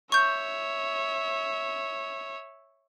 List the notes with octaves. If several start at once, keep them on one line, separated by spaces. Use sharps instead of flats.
C#5 E5 C#6 G6